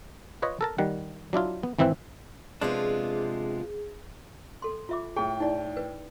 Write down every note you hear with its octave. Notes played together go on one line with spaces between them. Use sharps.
F4 B4 C#5 D#5
A4 A#4 A5
D#3 G3 F#5
F#3 D4 E4 F4
B3
G#1 E3 C4 E4 B4
C3 F3 G#3 B3 D4 F4 G#4
A4 C6
F4 E5 D6
A2 G#4 G5
D#4 E4 D5
B4